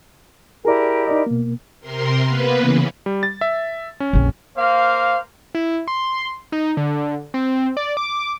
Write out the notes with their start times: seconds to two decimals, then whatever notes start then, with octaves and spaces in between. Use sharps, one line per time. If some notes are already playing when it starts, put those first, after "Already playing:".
0.65 E4 G4 G#4 A#4 D5
1.07 D#4 D5 D#5
1.26 B2 A#3
1.81 C3 A#4 C6
2.25 A#3 B3 B4
2.57 C#3 E3
3.06 G3
3.23 A6
3.41 E5
4.00 C#4
4.13 A#1 F2
4.56 A#3 C5 F5
5.55 E4
5.88 C6
6.52 D#4
6.77 D3
7.34 C4
7.77 D5
7.97 D6